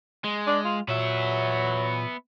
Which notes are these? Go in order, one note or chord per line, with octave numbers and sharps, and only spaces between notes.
G#3
D4
F4
A#2 F#3 B3 E5